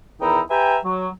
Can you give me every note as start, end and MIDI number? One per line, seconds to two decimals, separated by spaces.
0.21 0.41 40
0.21 0.41 51
0.21 0.41 63
0.21 0.41 64
0.21 0.41 79
0.21 0.41 82
0.51 0.78 67
0.51 0.78 71
0.51 0.78 76
0.51 0.78 79
0.51 0.78 80
0.51 0.78 82
0.85 1.08 54